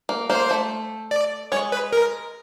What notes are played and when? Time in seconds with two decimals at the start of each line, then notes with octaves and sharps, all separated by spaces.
0.09 A#3
0.30 A#3 C5
0.51 A3
1.11 D5
1.52 G#3 C#5
1.72 B4
1.93 A#4